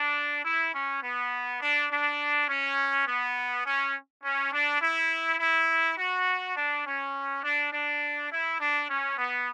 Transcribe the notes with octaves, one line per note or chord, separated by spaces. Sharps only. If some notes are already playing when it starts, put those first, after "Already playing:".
Already playing: D4
E4
C#4
B3
D4
D4
C#4
B3
C#4
C#4
D4
E4
E4
F#4
D4
C#4
D4
D4
E4
D4
C#4
B3